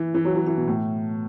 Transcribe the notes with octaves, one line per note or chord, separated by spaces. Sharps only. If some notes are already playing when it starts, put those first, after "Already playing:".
Already playing: E3
E3
F#3
F#3
E3
B2
A2